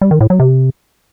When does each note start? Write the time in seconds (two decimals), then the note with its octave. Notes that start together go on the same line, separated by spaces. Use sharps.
0.01 G3
0.11 D#3
0.21 A2
0.30 F#3
0.40 C3